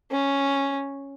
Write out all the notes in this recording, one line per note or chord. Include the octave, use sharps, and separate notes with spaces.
C#4